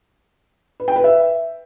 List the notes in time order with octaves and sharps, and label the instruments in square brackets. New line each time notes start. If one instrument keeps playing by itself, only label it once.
[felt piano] B4
G5
B4
E5